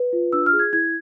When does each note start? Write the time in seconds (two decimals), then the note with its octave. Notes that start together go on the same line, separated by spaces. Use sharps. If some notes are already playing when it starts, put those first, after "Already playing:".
Already playing: B4
0.13 F4
0.33 D4 E6
0.46 F6
0.53 G#4
0.59 G#6
0.73 E4 G#6